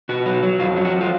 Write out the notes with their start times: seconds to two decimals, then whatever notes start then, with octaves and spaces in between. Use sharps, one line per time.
0.09 B2 F#4
0.26 F#3
0.43 F#3
0.59 F2 F4
0.76 F#3
0.85 F#4
0.93 F2
1.01 F4